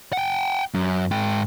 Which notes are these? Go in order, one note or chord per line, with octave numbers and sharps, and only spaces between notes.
F#5 G5
F#2
G#2 G5